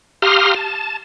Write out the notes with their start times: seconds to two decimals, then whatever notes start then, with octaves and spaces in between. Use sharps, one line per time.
0.22 G4 F5 A#5 C6 D#6 F6
0.56 A5